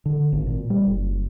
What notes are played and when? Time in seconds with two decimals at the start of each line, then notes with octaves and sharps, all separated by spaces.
0.06 D3
0.32 G#1
0.47 A#2
0.70 G3
0.86 F#1